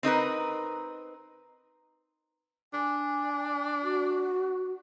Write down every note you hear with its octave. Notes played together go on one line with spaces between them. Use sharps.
C4 D#4 A#4 B4
D4 G#5
F#4